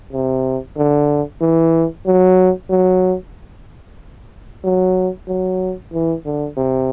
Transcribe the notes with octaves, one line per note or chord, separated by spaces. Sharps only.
C3
D3
E3
F#3
F#3
F#3
F#3
E3
D3
C3